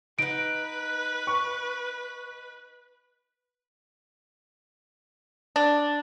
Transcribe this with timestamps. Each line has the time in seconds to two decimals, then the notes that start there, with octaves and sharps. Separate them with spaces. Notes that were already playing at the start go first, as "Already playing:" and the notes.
0.19 D#4 B4 F#5 D7
1.27 C#6
5.56 D4